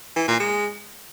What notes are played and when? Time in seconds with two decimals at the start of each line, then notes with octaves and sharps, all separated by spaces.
0.16 E3
0.28 A#2
0.40 G#3